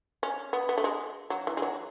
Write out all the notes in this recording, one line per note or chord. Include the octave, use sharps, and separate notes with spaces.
C#4
B3
B3
A3
G#3
F#3
E3
G#3
F#3